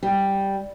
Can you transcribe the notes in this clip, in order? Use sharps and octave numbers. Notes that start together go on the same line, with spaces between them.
G3